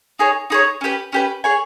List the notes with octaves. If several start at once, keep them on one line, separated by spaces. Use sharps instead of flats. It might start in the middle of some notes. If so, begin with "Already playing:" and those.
D#4 G#4 C#5
D#4 G#4 C#5
C#4 G4 B4
C#4 G4 B4
G#4 C#5 G#5